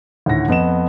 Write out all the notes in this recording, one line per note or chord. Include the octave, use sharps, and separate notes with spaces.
D2 A2 D#3 F#5 A#6
F2 B3 D#5 E7